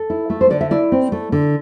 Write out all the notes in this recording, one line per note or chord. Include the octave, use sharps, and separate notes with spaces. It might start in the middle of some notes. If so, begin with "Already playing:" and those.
Already playing: A4
E4
A3
C5
D3 D5
E5
E4 D5
C4
A3
D3